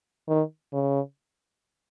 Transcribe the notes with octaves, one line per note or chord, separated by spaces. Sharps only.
D#3
C#3